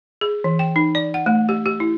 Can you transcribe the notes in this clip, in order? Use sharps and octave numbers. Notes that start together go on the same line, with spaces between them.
G#4
E3
G5
D#4
D5
F#5
A3
G4
G4
E4